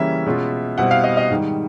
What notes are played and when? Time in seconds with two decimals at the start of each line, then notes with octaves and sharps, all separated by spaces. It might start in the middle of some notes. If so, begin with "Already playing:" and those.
Already playing: C#3 E3 G3 A#3 C#4 E5
0.26 B2 G#3 C#4 F4
0.78 B2 G3 C4 E4 F#5
0.91 F5
1.04 D#5
1.17 D#5
1.30 G#2 D#3 G3